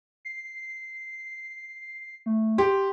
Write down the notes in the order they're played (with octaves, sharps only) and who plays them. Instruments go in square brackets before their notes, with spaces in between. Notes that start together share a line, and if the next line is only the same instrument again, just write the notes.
[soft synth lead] C7
A3
[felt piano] G4 [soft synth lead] C6